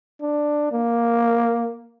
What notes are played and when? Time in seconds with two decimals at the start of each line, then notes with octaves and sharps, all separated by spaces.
0.22 D4
0.72 A#3